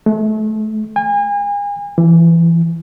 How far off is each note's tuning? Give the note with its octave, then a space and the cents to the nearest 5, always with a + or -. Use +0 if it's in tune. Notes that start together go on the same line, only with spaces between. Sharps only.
A3 -30
G#5 -35
E3 +20